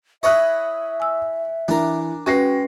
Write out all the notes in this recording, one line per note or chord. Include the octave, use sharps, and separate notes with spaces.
E4 C#5 D#5 E5 C#6 D#6 F#6
G#5 E6
E3 D4 A#4
G#3 C#4 F#4 B4 G5 A#6 C7